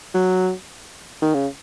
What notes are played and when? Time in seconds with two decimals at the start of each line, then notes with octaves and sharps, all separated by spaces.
0.14 F#3
1.22 D#3
1.34 C#3